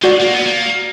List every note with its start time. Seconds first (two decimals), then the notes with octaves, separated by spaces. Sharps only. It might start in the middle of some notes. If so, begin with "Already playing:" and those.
0.02 G#3 F#4 D5 F#5
0.20 A#3
0.33 B3
0.46 A#3